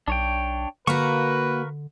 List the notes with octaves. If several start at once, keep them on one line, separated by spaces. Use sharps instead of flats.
B1 D4 C#5 G5
D3 A#3 F#4 A#4 B4 F5 C#6